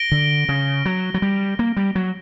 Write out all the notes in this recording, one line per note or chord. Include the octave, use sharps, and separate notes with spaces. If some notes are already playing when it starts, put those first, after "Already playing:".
Already playing: A#6 D7 G7
D3
C#3
F#3
F#3
G3
A#3
G3
F#3